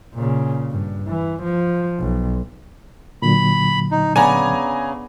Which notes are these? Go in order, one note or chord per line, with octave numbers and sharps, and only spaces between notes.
A#2 C#3
G2
E3
F3
B1
A#2 D3 F#3 B5
D#4
C#3 B3 D4 G#5 A#5